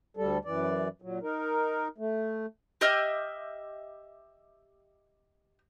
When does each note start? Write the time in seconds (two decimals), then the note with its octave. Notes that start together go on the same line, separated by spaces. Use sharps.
0.17 D2 G3 A4
0.45 F#2 E3 D5
1.02 A#2 F#3
1.22 D#4 A#4
1.98 A3
2.81 G4 D#5 E5 F6